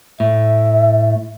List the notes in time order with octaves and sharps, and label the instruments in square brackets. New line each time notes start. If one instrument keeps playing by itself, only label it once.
[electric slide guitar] A2 [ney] E5